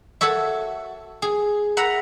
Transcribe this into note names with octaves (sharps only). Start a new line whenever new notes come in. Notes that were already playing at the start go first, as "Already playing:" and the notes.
F#4 A4 C#5 E5
G#4
E5 F#5 A#5 B5